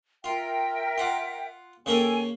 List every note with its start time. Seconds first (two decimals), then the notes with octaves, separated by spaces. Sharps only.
0.24 F4 A#4 E5 G5
0.98 F4 F#5 D6
1.86 C#3 A#3 A4 A#4 G5 G#5